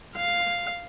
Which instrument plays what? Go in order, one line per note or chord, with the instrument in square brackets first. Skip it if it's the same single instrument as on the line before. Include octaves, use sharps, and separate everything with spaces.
[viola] F5